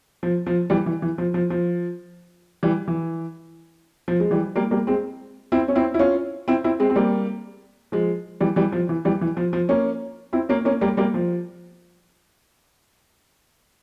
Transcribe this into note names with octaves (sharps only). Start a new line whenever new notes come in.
F3
F3
E3 G3
E3
E3
F3
F3
F3
E3 G3
E3
F3
G#3
E3 G3
G3 A#3
G3 A#3
G#3 C4
C4 E4
C#4
C4 E4
E4
C#4 F4
C4 E4
C4 E4
G#3 C4
C4
G3 A#3
F3 G#3
E3 G3
E3 G3
F3
E3
E3 G3
E3
F3
F3
A#3 C#4
C4 E4
A#3 C#4
A#3 C#4
G3 A#3
G3 A#3
F3